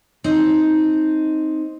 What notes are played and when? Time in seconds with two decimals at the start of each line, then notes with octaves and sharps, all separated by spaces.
0.24 C4 D#4